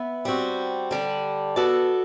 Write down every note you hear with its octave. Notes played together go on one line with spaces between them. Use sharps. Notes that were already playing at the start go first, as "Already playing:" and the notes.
Already playing: B3 B4 E5
G3 C4 F#4
D3 G3 D4
B3 F#4 A4 D5